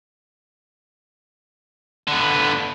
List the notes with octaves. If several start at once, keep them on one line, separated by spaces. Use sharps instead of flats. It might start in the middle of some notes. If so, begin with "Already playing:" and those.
D3 B3